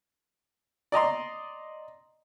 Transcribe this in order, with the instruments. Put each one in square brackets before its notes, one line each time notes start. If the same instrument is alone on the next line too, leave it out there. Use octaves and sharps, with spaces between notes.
[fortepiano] D5 D#5 A#5 C6